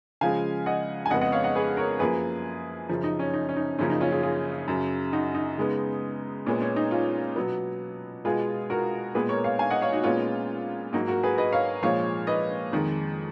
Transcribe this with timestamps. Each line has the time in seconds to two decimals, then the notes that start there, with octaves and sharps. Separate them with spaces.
0.21 C#3 F3 G#3 F5 G#5
0.66 D#5 F#5
1.06 G#5
1.10 F2 C#3 G#3 B3 D#5 F#5
1.21 D#5 F#5
1.32 C#5 F5
1.44 D#5 F#5
1.55 G#4 B4
1.77 A#4 C#5
1.99 F#2 F3 A#3 G#4 B4
2.89 F#2 C#3 F3
3.03 D#4
3.19 C#4
3.33 D#4
3.49 C#4
3.56 D#4
3.79 F#2 C#3 F3 A#3 C#4
3.90 D#4
4.01 C#4 F4
4.11 F4 G#4
4.23 F4 G#4
4.68 F#2 C#3 F#3
5.13 D#4 F#4
5.34 D#4
5.58 C#3 G#3 B3
6.46 A#2 G#3 B3 C#4
6.61 C#4
6.76 D#4
6.91 C#4 F4
7.36 B2 F#3 B3
8.25 B2 G#3 B3 F4 G#4
8.70 F#4 A#4
9.15 A#2 G#3 B3 G#4 B4
9.29 A#4 C#5
9.44 C#5 F5
9.59 F5 G#5
9.70 D#5 F#5
9.81 C#5 F5
9.93 D#4 F#4
10.04 A#2 G#3 B3 C#4 F4
10.93 G#2 F#3 A#3 D#4 F#4
11.08 F#4 A#4
11.23 G#4 B4
11.38 B4 D#5
11.52 C#5 F5
11.83 A#2 F3 G#3 C#5 F5
12.27 B4 D#5
12.72 F2 D#3 G#3